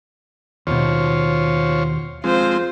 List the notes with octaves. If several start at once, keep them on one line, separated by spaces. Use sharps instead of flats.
D#2 B2 F4 C5 C#5
F3 G#3 C4 F4 C5